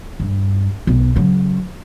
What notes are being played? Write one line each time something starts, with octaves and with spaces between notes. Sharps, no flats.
G2
B1
C#3 F#3